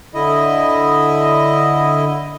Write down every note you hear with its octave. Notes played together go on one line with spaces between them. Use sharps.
D3 E4 D#5